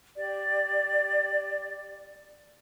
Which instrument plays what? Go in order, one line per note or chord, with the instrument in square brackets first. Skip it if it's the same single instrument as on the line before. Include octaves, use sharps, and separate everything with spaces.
[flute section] G4 D5